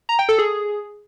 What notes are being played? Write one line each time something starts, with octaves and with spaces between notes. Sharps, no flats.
A#5
G5
A4
G#4